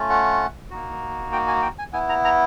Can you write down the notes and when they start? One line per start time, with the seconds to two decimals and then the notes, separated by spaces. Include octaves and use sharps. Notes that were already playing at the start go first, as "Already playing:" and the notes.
Already playing: A3 C#4 F4
0.10 F#5
0.71 A#3 D#4 F#4
1.33 G5
1.48 G#5
1.62 G5
1.78 G#5
1.93 B3 E4 G#5
2.09 A#5
2.25 A#5